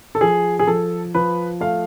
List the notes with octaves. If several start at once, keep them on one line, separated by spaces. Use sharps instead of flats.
A4
F3 G#4
G#4
F3 A4
F3 B4
A3 F5